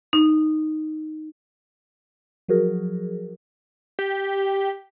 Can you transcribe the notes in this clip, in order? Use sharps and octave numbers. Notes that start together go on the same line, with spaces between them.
D#4
F3 F#3 F#4 G#4 A#4
G4